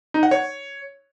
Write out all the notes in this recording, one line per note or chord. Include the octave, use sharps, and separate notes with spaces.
D#4
F#5
C#5